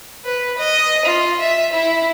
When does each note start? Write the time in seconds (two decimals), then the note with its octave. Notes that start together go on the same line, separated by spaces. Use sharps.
0.24 B4
0.58 D#5
1.05 F4
1.40 E5
1.73 E4